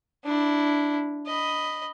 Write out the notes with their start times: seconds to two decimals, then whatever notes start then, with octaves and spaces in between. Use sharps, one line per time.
0.24 D4 E4
1.26 D#5 B5